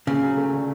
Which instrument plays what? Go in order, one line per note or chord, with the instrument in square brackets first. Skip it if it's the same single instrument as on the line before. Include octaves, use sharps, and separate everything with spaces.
[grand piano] A#2 [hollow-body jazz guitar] C#3
[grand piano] F#3
A3
D3